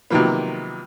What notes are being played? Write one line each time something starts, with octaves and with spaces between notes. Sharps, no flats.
C3 D#3 F3 F#3 A#3 B3